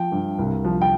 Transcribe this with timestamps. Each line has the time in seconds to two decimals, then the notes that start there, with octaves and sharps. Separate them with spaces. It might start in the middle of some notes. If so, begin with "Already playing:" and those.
Already playing: F3 G5
0.12 G2
0.39 C2
0.64 F3
0.81 G5